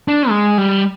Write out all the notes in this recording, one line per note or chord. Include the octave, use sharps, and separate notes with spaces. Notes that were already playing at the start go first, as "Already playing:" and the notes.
D4
G#3
G3